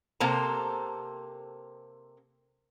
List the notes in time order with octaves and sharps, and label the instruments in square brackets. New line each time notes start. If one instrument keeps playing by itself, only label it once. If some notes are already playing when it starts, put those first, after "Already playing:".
[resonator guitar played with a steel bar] C3 A#3 A4 C5 A#5